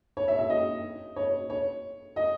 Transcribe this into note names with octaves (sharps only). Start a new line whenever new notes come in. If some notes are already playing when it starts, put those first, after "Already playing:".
C#5
E5
E5
D#5
C#5
C#5
D#5